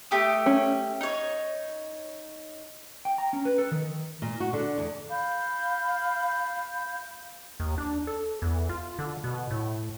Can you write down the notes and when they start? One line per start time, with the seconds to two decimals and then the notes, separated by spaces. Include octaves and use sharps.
0.11 A3 G4 D#6
0.46 C#4
1.01 D#4 C#5
3.05 G5
3.18 A#5
3.33 C#4
3.45 B4
3.58 A4
3.71 D#3
4.22 A#2
4.40 F#4
4.53 D3
4.78 E2
5.10 F5 B5 G6
7.60 D#2
7.78 D4
8.07 A4
8.42 E2
8.69 F4
8.99 D3
9.24 B2
9.50 A2